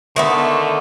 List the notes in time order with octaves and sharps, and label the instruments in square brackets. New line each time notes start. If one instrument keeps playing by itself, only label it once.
[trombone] D3 [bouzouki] D#3 A3 B3